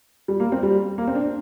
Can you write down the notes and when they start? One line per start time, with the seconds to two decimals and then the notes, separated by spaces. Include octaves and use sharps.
0.28 G3
0.40 A#3
0.52 C4
0.63 G3
0.98 A#3
1.08 C4
1.15 D4